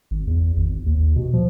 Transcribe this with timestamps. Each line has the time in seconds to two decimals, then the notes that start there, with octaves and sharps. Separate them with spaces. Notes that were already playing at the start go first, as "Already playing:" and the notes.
0.11 G#1
0.27 E2
0.57 G#1
0.86 D#2
1.16 B2
1.34 F3